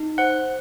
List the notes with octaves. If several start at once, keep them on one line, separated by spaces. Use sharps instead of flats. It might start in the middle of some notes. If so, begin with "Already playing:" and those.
Already playing: D#4
C5 F#5 F#6